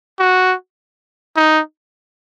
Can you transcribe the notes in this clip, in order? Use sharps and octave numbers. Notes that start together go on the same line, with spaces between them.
F#4
D#4